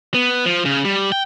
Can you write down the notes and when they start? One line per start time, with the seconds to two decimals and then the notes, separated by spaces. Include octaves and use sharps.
0.14 B3
0.45 F3
0.65 C#3
0.85 G3
1.12 G5